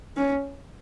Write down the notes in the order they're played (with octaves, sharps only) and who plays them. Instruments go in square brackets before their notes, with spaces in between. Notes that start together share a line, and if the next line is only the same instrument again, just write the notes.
[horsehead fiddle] C#4